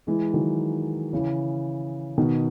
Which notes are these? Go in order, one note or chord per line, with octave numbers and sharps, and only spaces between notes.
E3 G#3
D#3 F#3
C#3 E3
B2 D#3